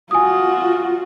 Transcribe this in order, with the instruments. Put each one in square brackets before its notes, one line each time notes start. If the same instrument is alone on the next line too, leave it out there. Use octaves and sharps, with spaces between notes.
[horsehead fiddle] F4 F#4 [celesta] G#5 D#6